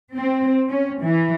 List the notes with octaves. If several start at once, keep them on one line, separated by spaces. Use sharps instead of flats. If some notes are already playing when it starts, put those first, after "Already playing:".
C4
C#4
E3